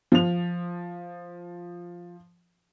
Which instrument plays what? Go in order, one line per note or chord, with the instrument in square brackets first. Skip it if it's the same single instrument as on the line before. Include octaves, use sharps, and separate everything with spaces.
[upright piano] F3 F7